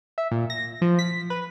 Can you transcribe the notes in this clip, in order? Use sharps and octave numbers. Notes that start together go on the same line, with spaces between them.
E5
A#2
A#6
F3
B6
B4